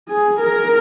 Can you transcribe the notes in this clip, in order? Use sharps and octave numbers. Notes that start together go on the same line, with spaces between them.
G#4
A#4